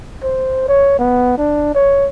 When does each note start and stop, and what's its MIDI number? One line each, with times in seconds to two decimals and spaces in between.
0.24 0.65 72
0.69 0.99 73
0.99 1.37 59
1.38 1.73 62
1.75 2.08 73